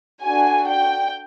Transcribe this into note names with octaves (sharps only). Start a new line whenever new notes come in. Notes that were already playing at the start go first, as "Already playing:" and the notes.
D4 F#4 A4 G#5
G5